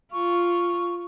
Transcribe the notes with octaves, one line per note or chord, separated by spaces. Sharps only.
F4 C#6